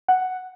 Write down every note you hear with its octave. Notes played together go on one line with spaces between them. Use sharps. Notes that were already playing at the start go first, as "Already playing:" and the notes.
F#5